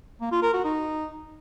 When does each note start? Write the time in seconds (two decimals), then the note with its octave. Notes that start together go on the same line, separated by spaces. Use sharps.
0.21 A#3
0.32 F4
0.43 A#4
0.53 F#4
0.64 D#4